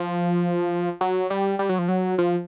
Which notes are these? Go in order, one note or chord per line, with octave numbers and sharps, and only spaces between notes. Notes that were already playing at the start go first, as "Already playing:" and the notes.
Already playing: F3
F#3
G3
G3
F#3
F3
F#3
F3